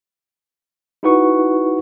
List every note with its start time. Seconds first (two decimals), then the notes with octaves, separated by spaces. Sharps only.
1.03 D#4 E4 F#4 B4 F#5 C#6